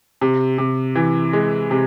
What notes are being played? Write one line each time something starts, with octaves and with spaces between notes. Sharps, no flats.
C3
C3
E3
G#3
C3